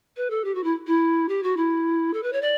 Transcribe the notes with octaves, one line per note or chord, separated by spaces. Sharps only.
B4
A4
G4
F#4
E4
E4
G4
F#4
E4
A4
B4
C#5
D5